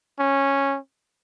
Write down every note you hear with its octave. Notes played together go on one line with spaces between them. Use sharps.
C#4